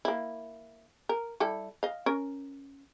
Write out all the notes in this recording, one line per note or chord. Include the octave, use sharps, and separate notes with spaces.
A#3 E4
A#4
G3 E4 A4
D#5 F5
C#4 A#4